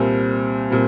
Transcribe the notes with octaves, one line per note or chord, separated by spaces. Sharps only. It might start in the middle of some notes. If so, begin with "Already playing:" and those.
Already playing: C2 A#2 G3 C4
A#2 G3 C4